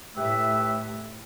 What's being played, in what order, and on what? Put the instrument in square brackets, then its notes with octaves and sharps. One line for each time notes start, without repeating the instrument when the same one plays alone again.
[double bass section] A2 [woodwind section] G4 B4 E5